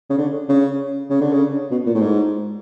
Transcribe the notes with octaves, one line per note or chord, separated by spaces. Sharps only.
C#3
D3
C#3
C#3
D3
C#3
B2
A#2
A2
G#2